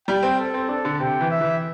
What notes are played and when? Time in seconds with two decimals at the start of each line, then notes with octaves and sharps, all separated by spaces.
0.08 G3 G5
0.23 C4
0.39 A4
0.54 C4
0.69 D4 A4
0.85 D3
1.00 C3 G5
1.21 E3
1.31 E5
1.41 E3